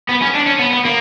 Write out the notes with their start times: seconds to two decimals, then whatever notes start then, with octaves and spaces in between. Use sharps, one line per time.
0.09 B3
0.22 C#4
0.35 D4
0.46 C#4
0.59 B3
0.72 B3
0.84 A#3